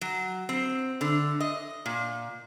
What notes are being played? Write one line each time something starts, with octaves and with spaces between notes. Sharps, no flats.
F#3
C4
D3
D#5
A#2